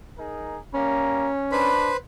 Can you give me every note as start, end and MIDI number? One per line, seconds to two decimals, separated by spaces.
0.18 0.59 63
0.18 0.59 68
0.18 0.59 70
0.74 1.30 55
0.74 1.30 58
0.74 1.69 61
0.74 1.30 82
1.52 1.91 62
1.52 1.97 71
1.52 1.97 72
1.52 1.97 83